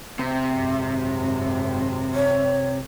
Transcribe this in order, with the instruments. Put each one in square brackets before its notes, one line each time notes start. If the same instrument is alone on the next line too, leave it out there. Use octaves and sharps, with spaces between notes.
[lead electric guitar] C3 [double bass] C4
[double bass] G#1 F#2
[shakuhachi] C#5